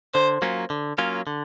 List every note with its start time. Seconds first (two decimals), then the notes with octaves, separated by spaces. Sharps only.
0.14 D3 C5
0.42 F#3 A#3 C#4 F4
0.70 D3
0.98 F#3 A#3 C#4 F4
1.27 D3